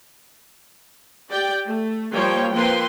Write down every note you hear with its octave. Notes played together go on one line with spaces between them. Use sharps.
G4 D5 G5
A3
F3 G3 A#3 C#5 G5
F3 A#3 C4 B4 G5 C6